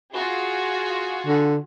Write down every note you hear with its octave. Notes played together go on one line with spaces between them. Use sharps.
F4 F#4 G#4
D3